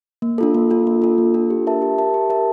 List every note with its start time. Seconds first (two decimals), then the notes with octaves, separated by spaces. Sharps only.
0.22 A#3
0.38 D4 F4 A4
0.55 A#3
0.70 D4 F4 A4
0.87 A#3
1.02 D4 F4 A4
1.18 A#3
1.34 D4 F4 A4
1.50 G4
1.67 A#4 E5 A5
1.82 G4
1.98 A#4 E5 A5
2.14 G4
2.30 A#4 E5 A5